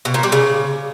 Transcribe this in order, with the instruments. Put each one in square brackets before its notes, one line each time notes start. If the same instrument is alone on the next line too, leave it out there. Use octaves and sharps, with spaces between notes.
[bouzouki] B2
A#2
G3
C#3